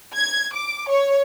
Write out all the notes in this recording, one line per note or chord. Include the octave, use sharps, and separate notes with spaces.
G#6
D6
C#5